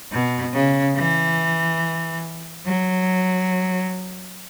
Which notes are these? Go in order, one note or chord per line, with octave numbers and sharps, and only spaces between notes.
B2
C#3
E3
F#3